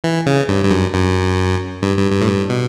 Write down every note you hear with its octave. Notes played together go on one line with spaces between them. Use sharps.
E3
C#3
G2
G2
F#2
F#2
G2
G2
G2
A2
G2
B2